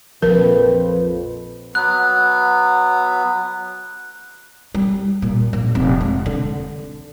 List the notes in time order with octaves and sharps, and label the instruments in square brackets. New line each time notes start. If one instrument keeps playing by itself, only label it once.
[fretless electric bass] A#1 F3 [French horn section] F2 B4 [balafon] A#4
[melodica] F#3 B3 [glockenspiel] F#6
[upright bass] G3
A#2
A#1
F1
G#3
D3